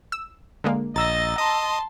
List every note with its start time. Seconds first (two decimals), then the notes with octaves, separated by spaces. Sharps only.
0.12 E6
0.64 D3 G#3 A#3
0.96 A#1 D#5 A#5 E6 A6 A#6
1.38 D#5 A5 C6 D#6